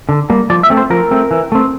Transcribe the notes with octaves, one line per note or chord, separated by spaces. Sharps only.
D3
G3 A#3
F3 D5
E5
A3 C4
C5
F3 A#4
A3 C4
E3
A3 C4